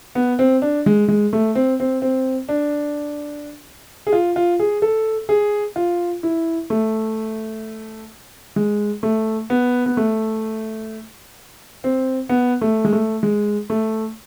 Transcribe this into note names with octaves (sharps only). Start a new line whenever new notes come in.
B3
C4
D4
G#3
G#3
A3
C4
C4
C4
D4
G#4
F4
F4
G#4
A4
G#4
F4
E4
A3
G#3
A3
B3
B3
A3
C4
B3
A3
G#3
A3
G#3
A3